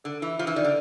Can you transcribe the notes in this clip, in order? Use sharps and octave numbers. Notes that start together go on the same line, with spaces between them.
D3 A#4
E3 F4
F3 F4
E3
D#3 D5
D3